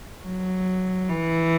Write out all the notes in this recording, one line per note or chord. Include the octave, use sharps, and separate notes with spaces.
F#3
E3